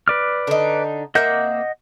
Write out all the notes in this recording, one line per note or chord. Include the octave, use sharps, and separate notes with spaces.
B4 D5 F6
D3 D#4
A#3 C4 D#5 E5 F#5 G6